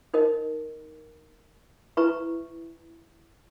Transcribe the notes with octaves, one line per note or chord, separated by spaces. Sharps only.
D#4 A#4 D#5
E4 B4 E5 A#5 C#6